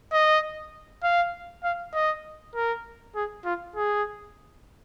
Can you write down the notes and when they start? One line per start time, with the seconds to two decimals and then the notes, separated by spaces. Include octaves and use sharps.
0.13 D#5
1.04 F5
1.64 F5
1.95 D#5
2.55 A#4
3.15 G#4
3.45 F4
3.76 G#4